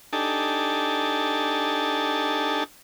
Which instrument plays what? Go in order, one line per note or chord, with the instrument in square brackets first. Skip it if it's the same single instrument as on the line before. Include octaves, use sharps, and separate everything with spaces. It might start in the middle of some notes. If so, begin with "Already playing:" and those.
[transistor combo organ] D4 D#4 G4 A4 G#5 A5